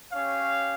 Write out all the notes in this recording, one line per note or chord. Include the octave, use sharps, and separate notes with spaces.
C#4 G4 C#5 F5